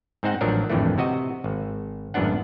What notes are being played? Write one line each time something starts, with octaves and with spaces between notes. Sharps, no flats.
G#2 C4 D#4 C5 F#5
A1 F3 F#3 D4 A#4
G#1 F2 A2 D3 E3 A3
C3 F#4 D#5
G#1
G#1 F#2 A2 B3 D4 F#5